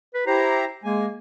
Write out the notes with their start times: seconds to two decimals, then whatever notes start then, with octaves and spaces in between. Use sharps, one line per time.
0.14 B4
0.27 E4 G4 C5 A#5
0.84 G#3 A#3 G#5